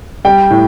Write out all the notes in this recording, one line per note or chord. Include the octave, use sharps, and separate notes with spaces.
G3 G5
A2